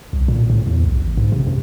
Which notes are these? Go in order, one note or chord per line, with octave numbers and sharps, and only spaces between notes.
C2
A#2
A2
E2
B1
A1
G#2
C3
F#2